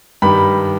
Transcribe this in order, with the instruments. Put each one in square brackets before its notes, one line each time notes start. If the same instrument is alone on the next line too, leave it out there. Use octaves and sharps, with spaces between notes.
[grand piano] G2 D#3 G3 B5